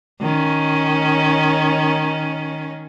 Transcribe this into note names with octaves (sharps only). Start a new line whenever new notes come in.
D#3 C#4